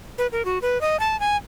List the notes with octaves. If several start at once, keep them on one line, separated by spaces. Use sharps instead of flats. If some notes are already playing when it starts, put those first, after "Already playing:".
B4
A#4
F#4
B4
D#5
A5
G#5